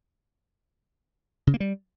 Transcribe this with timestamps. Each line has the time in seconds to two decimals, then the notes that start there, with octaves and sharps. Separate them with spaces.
1.47 C#3
1.54 A#3
1.60 G3